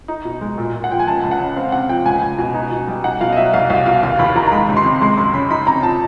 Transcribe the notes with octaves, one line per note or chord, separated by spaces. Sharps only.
D#4
B2
G#3
A#2
A#2
F#5
F3 G5
G#5
C#2 A5
C#2
F#5
C#3
C4 F5
C3 F#5
F3 G5
C#2 G#5
C#2
B2
D#4
B2
G3
D#4 F#5
B2 F5
D#5
F#3 E5
C2 F5
C2 F5
B2 F5
D#2 F5
D#2 B5
D#3 A#5
A#5
G#3 B5
C#2
C6
C3
G#3 C6
F#2 C6
C#3 B5
D#4 B5
C3 A#5
F3 A5